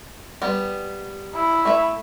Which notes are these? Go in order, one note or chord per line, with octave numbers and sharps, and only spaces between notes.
G3 B3
E4
A3 E5